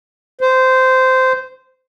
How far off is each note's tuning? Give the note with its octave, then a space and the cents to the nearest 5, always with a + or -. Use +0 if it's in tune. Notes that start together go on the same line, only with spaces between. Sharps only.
C5 -15